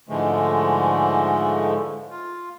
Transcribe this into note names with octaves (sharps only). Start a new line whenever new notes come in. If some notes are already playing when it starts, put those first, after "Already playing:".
G#2 D3 E3 F3 G#3 A3
F4